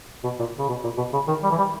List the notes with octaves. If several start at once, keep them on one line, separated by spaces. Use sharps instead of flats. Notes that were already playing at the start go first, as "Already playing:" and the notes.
B2
A#2
C#3
B2
A#2
B2
C#3
D#3
G3
E3
G3